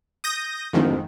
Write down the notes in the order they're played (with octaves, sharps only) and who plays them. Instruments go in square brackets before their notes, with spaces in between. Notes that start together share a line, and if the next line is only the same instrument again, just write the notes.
[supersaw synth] D#6 G6 A#6
[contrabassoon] D1 [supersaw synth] F2 G#2 D#3